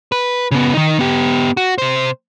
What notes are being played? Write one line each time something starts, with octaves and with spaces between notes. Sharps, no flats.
B4
C#3 B3
D#3 D#4
B3 G4
F#4
C3 C5